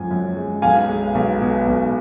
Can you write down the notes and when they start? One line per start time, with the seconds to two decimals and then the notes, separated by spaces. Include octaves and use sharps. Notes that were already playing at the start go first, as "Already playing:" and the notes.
Already playing: F#2 F3 G#3 G#5
0.11 F#2
0.37 G#3
0.62 B1 F5 G#5
0.89 G#3
1.15 B1
1.41 B2
1.67 B1